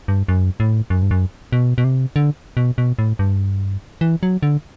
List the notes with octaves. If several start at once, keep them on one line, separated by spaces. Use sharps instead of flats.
G2
F#2
A2
F#2
G2
F#2
B2
B2
C3
D3
B2
B2
A2
G2
E3
F#3
D3